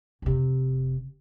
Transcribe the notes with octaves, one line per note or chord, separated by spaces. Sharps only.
F1 C3